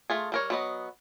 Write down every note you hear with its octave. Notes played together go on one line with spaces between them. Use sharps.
A3 F4 G#4
G3 A#4 C#5
F#3 B3 D#5